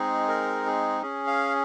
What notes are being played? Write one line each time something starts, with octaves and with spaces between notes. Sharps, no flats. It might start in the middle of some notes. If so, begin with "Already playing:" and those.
Already playing: G#3 C4 D#4 G#4
A#4
G#4
C#4 G#4
F5